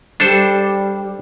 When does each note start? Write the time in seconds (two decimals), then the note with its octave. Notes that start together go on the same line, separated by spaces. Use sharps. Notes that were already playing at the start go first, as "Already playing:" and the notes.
0.20 G3 D4 A4 C5